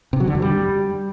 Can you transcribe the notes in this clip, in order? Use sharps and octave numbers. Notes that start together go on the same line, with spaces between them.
C3
F#3
D3
F#2
G3